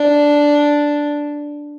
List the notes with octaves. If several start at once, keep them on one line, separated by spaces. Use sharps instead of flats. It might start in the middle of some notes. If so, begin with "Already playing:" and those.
Already playing: D4